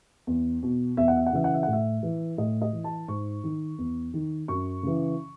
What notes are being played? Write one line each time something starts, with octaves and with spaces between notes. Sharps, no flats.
E2
B2
E2 E5
F#5
E5
F#5
C#3 E3 E5
F#5
E5
F#5
A2
E5
E3
A2 D#5
D#5
E3
A5
G#2 C#6
D#3
E2
D#3
F#2 C#6
C#3 E3